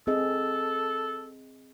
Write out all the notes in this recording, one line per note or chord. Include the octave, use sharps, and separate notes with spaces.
C4 G#4 A4 D#5